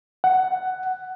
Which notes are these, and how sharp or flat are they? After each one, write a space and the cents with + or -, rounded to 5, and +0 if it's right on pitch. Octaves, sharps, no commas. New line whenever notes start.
F#5 +10